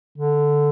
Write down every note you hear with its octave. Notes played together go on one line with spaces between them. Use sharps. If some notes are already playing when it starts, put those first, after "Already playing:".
D3